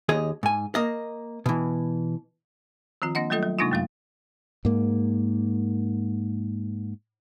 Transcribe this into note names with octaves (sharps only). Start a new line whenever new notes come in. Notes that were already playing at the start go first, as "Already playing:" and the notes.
D#2 G#4 C#5 D#5
G#2 G#5
A#3 D#5
B2 E3
D#3 F3 C4 F4
A#3 D4 D#5 F#5
F#3 G3 A3 F4 A4 D#5
F#3
C3 G#3 A#3 D4 D#4 F4
F#2 F#3 A3 F5
G#2 A#3